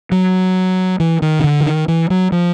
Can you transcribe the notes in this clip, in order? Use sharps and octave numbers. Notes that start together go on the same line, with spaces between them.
F#3
E3
D#3
C#3
D3
E3
D#3
E3
F#3
F3